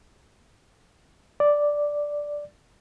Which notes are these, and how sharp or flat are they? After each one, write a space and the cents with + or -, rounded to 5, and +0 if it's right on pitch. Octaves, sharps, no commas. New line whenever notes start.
D5 +0